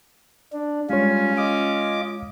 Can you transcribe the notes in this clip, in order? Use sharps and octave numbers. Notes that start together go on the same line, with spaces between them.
D4
G3 G#3 C#4 F4 C#5
F4 D#5 D6